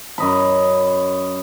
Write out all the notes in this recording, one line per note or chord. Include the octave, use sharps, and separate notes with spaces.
F#2 D#5 B5